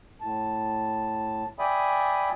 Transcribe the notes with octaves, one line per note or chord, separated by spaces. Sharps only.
A2 A5
D5 E5 G5 G#5 B5 D#6